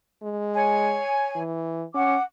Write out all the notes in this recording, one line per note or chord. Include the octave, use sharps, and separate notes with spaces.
G#3
C#5 G#5
E3
C#4 F#5 D6